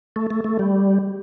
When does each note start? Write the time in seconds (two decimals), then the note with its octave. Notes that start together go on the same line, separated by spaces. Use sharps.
0.16 A3
0.30 A3
0.44 A3
0.59 G3